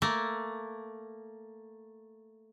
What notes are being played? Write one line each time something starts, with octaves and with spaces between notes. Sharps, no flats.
A3 A#3